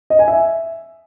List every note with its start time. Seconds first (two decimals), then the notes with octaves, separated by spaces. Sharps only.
0.10 D#5
0.19 G#5
0.28 E5